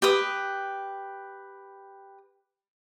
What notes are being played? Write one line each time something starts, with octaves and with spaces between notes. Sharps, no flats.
G4 B4 D#6